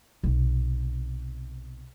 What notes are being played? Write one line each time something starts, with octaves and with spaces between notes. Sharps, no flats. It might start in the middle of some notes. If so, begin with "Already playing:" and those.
B1 C3